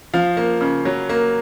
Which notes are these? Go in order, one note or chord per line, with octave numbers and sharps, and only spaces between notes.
F3 F5
A#3
C#3
F#3
A#3